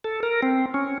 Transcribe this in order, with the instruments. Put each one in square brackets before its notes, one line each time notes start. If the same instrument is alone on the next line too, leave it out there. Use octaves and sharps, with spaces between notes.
[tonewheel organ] A4
A#4
C4
C#4